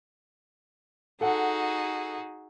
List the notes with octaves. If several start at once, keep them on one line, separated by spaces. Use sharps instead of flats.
D#4 F#4 G#4 A4 F#5